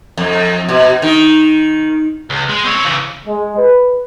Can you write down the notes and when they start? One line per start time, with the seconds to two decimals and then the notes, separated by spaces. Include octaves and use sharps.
0.17 F2
0.68 B2
1.02 D#3
2.30 C#2
2.49 G#3
2.64 C4 C#5
2.85 C#3 E3
3.26 G#3
3.58 B4